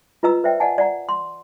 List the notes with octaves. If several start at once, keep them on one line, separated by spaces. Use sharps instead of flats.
F4 B4 D#5 A#5 E6
B4 C5 D5 E5 G5
D5 D#5 F#5 G#5 A5
D5 F#5 A#5
C6